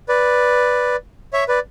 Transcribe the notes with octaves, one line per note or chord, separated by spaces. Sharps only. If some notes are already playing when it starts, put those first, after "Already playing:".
B4 D5
C#5 E5
B4 D5